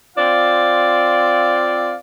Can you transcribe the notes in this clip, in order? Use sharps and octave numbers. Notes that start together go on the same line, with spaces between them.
C4 F4 C5 D5 F5